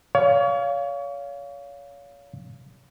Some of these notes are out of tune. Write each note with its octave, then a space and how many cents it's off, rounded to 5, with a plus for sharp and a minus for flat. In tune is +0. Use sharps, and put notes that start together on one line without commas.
C#5 +35 F5 +0